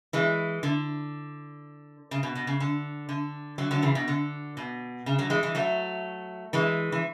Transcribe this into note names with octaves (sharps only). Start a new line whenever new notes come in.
E3 G#3
D3
C#3
B2
B2
C#3
D3
D3
D3 F#3
D3 F#3
C#3 E3
B2
D3
B2
C#3
D3 F#3
E3 G#3
E3 G#3
F#3 A3
E3 G#3
E3